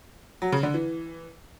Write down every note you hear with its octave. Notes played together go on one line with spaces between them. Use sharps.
F#3
C#3
D3
E3